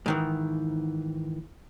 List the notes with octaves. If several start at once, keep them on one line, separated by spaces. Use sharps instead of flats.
G#2 D#3 E3